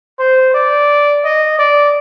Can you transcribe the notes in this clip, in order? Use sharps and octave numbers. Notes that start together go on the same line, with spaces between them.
C5
D5
D#5
D5